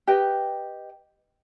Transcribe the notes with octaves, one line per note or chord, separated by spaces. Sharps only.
G4 B4 D#5 G5